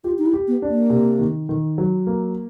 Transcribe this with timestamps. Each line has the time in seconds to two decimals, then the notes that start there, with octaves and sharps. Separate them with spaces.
0.04 F4 G4
0.19 D#4
0.26 E4
0.33 G4
0.48 B3
0.62 D4
0.69 A#3
0.90 C3
1.19 D#3
1.49 D#3
1.78 F#3
2.07 A#3